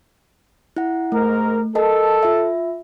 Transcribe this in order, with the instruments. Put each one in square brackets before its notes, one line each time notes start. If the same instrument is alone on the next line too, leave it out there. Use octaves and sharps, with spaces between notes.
[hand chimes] E4 F#5
[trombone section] G#2 A#4 [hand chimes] A3
[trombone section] A4 [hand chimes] A#4 D#5 A5
[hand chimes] F4 E5